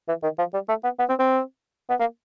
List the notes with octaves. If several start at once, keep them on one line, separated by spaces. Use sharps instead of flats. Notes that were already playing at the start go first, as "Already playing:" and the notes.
E3
D#3
F3
G3
A3
B3
B3
C4
C4
B3
A#3